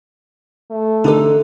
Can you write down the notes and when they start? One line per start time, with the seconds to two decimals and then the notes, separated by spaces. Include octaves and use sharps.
0.71 A3
1.04 D3 D#4 G4 A4